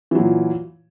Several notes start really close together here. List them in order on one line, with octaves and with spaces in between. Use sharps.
E3 F#3 A#2